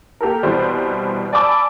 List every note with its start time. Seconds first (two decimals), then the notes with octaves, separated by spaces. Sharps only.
0.21 A#3 G4 A4 A#4
0.43 C2 B2 E3 G3 C5 B5
1.33 D5 G#5 A5 B5 D6 E6